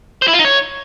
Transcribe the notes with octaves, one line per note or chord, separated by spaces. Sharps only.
C5
E4
F4
D#4
C#5